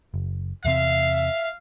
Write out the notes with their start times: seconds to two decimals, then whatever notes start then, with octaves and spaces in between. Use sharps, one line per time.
0.14 F#1
0.65 E2 C3 C4 E5 F5